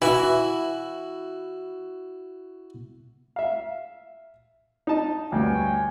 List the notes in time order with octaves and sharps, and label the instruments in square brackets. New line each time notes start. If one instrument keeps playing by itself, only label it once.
[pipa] E3 [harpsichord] E4 F#4
[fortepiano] E5 F5
D#4 A5
[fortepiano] D2 G2 [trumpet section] C#5 G5 G#5